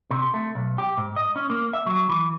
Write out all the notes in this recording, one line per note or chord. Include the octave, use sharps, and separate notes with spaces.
C3
A3
B1
G4
G#2
D#5
C#4
A#3
E5
F#3
E3